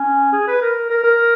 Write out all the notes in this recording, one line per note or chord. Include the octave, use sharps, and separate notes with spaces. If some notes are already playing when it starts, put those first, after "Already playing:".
Already playing: C#4
G#4
B4
A#4
A#4
A#4